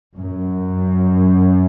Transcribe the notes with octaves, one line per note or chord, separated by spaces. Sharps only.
F#2